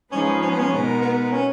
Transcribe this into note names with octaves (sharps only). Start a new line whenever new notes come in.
F3 G#3 C#4 D#4 G#4 B4
C#4
B3
C#4
B2 G#3 B3 D#4 A#4
B3
C#4